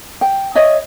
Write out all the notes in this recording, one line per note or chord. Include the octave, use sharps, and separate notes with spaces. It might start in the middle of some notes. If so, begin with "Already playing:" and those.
G5
C#5 D#5 E5